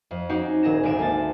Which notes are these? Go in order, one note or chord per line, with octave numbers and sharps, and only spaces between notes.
F2
C4 C#4 D#4 F#4 G4 C5
D#1 A#2 G#4 A#6 E7
G#1 D2 D#4 G#5 D7 E7
D2 A#3 A5 A6